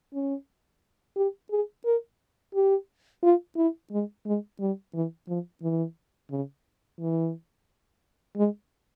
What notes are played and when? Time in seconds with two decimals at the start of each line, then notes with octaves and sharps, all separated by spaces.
0.14 C#4
1.16 G4
1.51 G#4
1.85 A#4
2.55 G4
3.23 F4
3.57 E4
3.91 G#3
4.26 G#3
4.60 G3
4.94 E3
5.28 F3
5.62 E3
6.31 C#3
7.00 E3
8.36 G#3